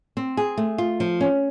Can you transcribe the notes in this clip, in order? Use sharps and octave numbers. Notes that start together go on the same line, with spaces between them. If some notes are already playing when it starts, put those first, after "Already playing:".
C4
G#4
A3
F4
F3
C#4